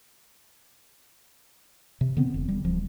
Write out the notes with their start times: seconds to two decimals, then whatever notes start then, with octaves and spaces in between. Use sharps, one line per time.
2.01 C3
2.17 D3 B3 C4
2.34 E1
2.48 G3
2.65 D1 F3